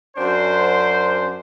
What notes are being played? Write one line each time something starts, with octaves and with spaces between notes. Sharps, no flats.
F#2 D4 C5